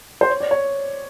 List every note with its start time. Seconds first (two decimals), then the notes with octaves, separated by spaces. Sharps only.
0.21 C5
0.30 C#5
0.40 D5
0.51 C#5